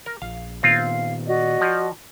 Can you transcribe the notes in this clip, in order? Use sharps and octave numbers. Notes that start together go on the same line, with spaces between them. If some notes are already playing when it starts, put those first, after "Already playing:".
A#4
A#1 F5
A#2 D#3 B3 C4 F4 F5
F#4 D5 D#5
F3